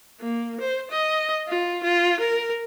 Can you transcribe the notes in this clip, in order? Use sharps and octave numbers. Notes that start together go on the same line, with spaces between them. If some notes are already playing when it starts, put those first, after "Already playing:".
A#3
C5
D#5
F4
F4
A#4